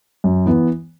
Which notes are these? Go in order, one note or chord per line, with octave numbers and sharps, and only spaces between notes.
F#2
E3 B3